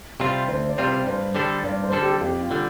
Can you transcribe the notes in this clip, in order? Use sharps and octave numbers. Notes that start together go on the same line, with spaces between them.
C3 G3 C4 F4
D2 C5
D5
C3 G3 C4 F4
C5
G2 C5
D3 G3 D4 A4
G2 D5
C5
D3 G3 D4 A4
G4
F2 G4
F4
D3 G3